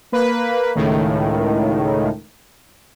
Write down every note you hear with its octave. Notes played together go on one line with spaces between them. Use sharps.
A#3 B4
C#2 A2 D#3